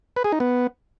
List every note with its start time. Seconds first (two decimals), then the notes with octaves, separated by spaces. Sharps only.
0.16 B4
0.24 G#4
0.32 D#4
0.40 B3